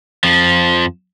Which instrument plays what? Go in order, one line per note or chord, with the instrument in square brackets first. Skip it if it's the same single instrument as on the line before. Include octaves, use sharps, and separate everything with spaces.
[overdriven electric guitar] F2 F3